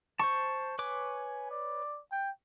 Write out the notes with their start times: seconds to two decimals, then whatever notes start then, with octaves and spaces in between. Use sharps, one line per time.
0.19 C5 A5 C#6
0.79 B4 C#5 G#5 D6
1.51 D5
2.12 G5